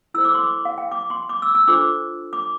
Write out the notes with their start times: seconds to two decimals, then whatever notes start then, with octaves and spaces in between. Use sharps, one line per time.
0.14 E4 A4 C5 E6
0.25 D6
0.34 C6
0.44 D6
0.65 F5
0.78 G5
0.91 D6
1.10 C6
1.29 D6
1.42 E6
1.55 E6
1.68 D4 F4 A4 C5 D6
2.33 D6